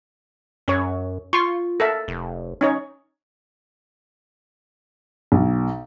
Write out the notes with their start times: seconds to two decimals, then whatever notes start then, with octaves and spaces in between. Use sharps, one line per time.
0.68 F#2 C#4 C#5
1.33 F4 C6 C#6
1.80 A4 A#4 E5
2.08 F1
2.61 C#4 D#4 C#5
5.32 B1